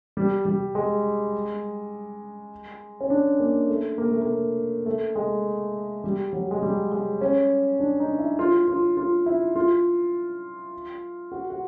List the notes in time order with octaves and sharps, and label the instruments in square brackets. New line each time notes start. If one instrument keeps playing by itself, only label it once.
[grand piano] G3
G3
G#3
C#4
D4
A#3
A3
A#3
A3
A#3
A3
G#3
G3
F#3
G#3
G3
G#3
C#4
D4
D#4
E4
F4
F4
F4
E4
F4
F#4
F#4